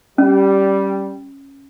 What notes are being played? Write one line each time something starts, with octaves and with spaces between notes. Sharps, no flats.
G3 C#4